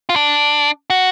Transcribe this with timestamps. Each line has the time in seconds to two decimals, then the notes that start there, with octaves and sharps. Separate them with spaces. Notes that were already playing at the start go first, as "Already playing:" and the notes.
0.09 F4
0.16 D4
0.90 F#4